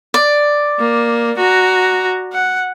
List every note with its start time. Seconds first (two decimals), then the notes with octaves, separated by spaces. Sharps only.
0.14 D5
0.79 A#3
1.37 F#4 A#5
2.33 F#5